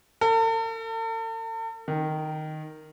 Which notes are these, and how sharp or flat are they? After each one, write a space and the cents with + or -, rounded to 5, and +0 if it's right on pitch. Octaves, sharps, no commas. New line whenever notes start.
A4 +45
D#3 -5